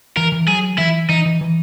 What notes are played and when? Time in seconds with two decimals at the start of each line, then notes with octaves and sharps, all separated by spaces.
0.17 E3 A#4
0.32 E3
0.48 F#3 G#4
0.78 E3 E4
1.09 E3 D#4
1.26 E3
1.41 E3